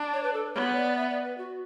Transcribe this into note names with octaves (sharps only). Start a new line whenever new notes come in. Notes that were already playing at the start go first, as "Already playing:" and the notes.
Already playing: D4
C#5
B4
A4
B4
B3 C#5
D5
E5
D5
B4
F#4